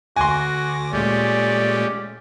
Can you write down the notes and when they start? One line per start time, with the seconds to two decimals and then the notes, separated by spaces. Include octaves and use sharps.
0.16 D2 F#4 G#5 C6 D6 A#6
0.93 A#2 G#3 A3 C#4 G4 D5